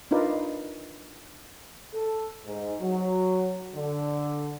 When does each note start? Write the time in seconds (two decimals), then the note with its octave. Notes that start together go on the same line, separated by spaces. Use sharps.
0.11 D4 D#4 F4 A#4 B4 D5
1.94 A4
2.45 G#2
2.79 F#3
3.74 D3